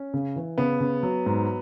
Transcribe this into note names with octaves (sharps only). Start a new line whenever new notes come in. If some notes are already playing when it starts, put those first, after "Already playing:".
Already playing: C#4
C#3
E3
C#3 B3
C#3
F#3
G#2